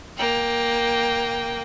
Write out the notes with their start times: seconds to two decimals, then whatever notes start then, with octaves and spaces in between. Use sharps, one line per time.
0.17 A#3 G5